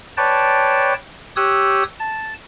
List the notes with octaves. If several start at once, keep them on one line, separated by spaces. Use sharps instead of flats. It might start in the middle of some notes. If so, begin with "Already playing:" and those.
B4 C#5 D5 G5 A5
G4 C#5 D#6 E6 F#6 G6
A5